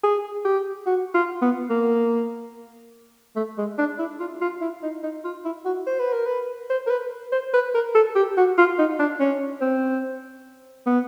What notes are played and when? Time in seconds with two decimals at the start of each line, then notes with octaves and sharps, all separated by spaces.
0.04 G#4
0.45 G4
0.86 F#4
1.14 F4
1.42 B3
1.70 A#3
3.36 A3
3.58 G#3
3.78 D4
3.99 E4
4.20 F4
4.41 F4
4.61 E4
4.83 D#4
5.03 D#4
5.24 F4
5.45 E4
5.65 F#4
5.87 C5
6.00 B4
6.13 A#4
6.26 B4
6.70 C5
6.87 A#4
6.90 B4
7.32 C5
7.54 B4
7.74 A#4
7.95 A4
8.16 G4
8.37 F#4
8.58 F4
8.79 D#4
9.00 D4
9.20 C#4
9.61 C4
10.86 B3